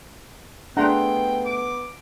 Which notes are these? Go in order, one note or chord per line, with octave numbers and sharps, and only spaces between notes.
A3 B3 D4 G#4 F#5 G5 A#5 C6
D6